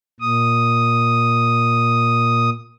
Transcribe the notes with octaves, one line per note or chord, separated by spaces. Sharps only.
A#2 D#6